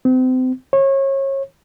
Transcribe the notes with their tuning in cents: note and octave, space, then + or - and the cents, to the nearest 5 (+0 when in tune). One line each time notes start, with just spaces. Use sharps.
C4 -35
C#5 -30